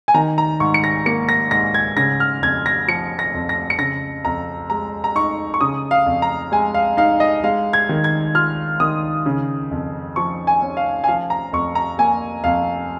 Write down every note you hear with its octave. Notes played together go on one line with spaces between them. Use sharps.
G#5
D#3 A#5
A#5
G#2 C#6
C#7
A#6
A#3 C#7
A#6
G#2 A#6
G#6
C#3 A#6
F6
F2 G#6
A#6
F3 C#7
A#6
F2
A#6
C#7
C#3 A#6
F2 A#5
G#3 A#5
A#5
D#4 C#6
C#6
C#3 D#6
F5
F2
A#5
G#3 G#5
F5
D#4 F5
D#5
G#3 F5
G#6
D#3
G#6
F4 F6
D#3 D#6
C#3
F2
F3 C#6
G#5
C#4
F5
G#5
F3 F5
A#5
F2 C#6
A#5
A#3 G#5
F2 F5